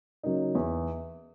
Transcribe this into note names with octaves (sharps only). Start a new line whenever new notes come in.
C#3 F#3 A#3 D#4
E2